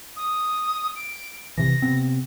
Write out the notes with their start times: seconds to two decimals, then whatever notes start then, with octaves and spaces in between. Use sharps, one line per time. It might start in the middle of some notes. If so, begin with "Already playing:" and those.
0.17 D#6
0.96 D7
1.57 C3 E3 A#6
1.82 C3 B3 C4